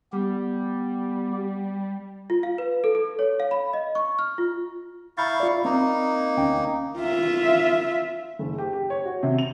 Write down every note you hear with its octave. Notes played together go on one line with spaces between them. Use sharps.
G3 B3 G4
F4
F5
B4
A4
A4
C#5
F5
B5
D#5
C#6
F6
F4
E4 F5 A#5 C#6 G6 A6
F4 D5
A#3 C4 D#4 A#5
D2 C#4 G5
F4 E5
F#1
G4
G4
C#5
F#4
C3
F7